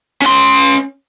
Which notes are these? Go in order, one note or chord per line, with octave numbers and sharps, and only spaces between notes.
C#4 C6